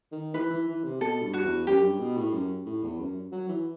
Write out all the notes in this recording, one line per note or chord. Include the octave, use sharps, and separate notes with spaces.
D#3
E3 B4
E3
E3
C3
B2 A4
G2
F#4
E2
F#2 G4
G2
B2
A2
F#2
A2
E2
F#2
F#3
E3